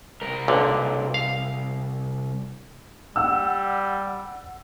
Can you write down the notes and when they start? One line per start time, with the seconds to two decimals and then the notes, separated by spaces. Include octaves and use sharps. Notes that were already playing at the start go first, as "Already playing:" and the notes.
0.21 C2 A#4
0.48 B1 A#2 D3
1.14 F5
3.16 G3 F#5 E6